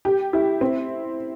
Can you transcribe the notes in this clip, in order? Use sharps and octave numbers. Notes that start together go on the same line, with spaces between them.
G4
E4
C4